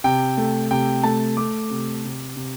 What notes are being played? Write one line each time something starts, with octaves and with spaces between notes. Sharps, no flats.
C3 G5
A3
C3 G5
A3 A5
A3 D6
C3
C3
C3